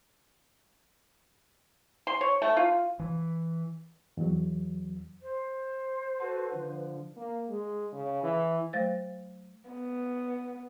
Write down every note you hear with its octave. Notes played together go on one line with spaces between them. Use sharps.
C6
C#5
A3
F4
E3
E2 F#3
C5
F#4 A4 B4
D3 F3
A#3
G#3
C#3
E3
F#3 A3 C5 F5 A6
B3